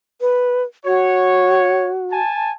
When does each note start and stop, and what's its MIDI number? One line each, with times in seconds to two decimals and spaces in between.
0.21 0.63 71
0.85 2.18 66
0.85 1.90 73
2.11 2.52 80
2.11 2.52 81